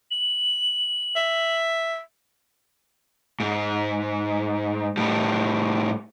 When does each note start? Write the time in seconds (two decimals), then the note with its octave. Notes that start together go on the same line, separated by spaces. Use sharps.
0.11 F#7
1.16 E5
3.40 G#2
4.97 A2 G3